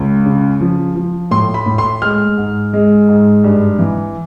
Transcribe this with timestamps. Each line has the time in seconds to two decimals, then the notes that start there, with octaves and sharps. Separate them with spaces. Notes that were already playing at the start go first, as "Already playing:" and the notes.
Already playing: C#2
0.26 C#3
0.61 F3
0.96 F3
1.31 A2 C6
1.54 B5
1.66 A2
1.78 C6
2.02 G#3 F6
2.37 G#2
2.73 G#3
3.09 G#2
3.44 G2
3.79 E3